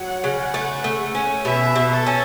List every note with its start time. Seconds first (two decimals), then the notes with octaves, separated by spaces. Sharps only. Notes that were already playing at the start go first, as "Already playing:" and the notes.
Already playing: F#3 F#5
0.24 C#3
0.54 A3
0.84 A3
1.15 C#4
1.45 B2 E5
1.76 B2
1.91 A4
2.06 C#4